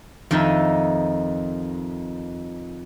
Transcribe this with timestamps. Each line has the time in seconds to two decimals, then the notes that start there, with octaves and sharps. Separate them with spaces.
0.31 F2 D#3 D#4 D#5 E5